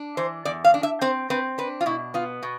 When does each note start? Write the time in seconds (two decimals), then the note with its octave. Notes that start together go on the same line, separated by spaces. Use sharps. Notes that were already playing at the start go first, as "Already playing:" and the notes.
Already playing: D4
0.17 E3 C5
0.45 E2 D5
0.64 F5
0.74 D4
0.83 E5
1.01 C4 C5
1.30 C4 B4
1.58 D4 B4
1.81 F4
1.86 B2 E4
2.14 B3 F4
2.43 B2